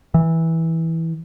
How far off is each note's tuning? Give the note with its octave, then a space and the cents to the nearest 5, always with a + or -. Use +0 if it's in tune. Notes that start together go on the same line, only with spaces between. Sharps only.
E3 -15